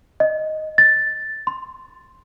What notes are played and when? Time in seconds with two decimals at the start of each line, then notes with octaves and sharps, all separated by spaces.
0.20 D#5
0.78 A6
1.47 C6